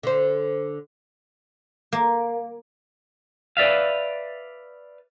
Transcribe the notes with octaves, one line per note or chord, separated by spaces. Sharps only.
D3 C5
A#3
B4 D5 E5 F5